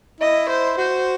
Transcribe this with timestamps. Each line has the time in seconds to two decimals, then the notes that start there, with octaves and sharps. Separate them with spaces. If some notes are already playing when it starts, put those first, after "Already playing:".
0.21 E4 D#5
0.49 C5
0.78 F#4 C5